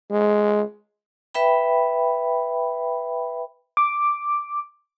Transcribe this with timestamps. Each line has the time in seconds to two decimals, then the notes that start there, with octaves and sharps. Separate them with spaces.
0.11 G#3
1.35 B4 E5 G5 B5
3.77 D6